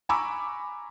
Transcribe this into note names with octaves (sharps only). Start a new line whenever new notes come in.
G#5 A#5 B5 C#6 D6 E6